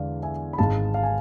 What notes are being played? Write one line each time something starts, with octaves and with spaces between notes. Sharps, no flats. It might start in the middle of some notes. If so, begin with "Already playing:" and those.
Already playing: E2 D3 G#3 D5 F5
E5 G#5
B5
G#1 G#2 G#3 F5 A5
F5
G#5